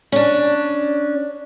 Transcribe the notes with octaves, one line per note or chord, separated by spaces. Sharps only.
C#4 D4